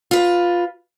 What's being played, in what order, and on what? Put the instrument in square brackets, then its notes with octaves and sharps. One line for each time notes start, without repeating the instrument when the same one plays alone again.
[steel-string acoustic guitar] F4 B4